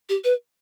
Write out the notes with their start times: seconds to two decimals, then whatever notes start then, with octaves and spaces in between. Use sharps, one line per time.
0.09 G4
0.24 B4